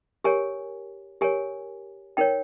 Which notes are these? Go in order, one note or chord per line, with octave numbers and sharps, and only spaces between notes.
G4 A#4 C#5 G#5
G4 A#4 C#5 G#5
D#4 A#4 C#5 G5